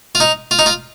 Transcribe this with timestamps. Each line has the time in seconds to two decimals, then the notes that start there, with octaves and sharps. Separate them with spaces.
0.15 F4
0.20 D#4
0.51 F4
0.59 D#4
0.66 F4